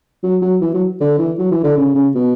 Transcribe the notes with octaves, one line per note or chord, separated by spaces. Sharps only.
F#3
F#3
E3
F#3
D3
E3
F#3
E3
D3
C#3
C#3
B2